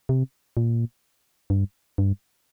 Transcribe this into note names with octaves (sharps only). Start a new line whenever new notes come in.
C3
A#2
G2
G2